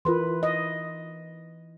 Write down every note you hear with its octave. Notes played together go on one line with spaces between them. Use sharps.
E3 F4 A#4 B4 C6
D#5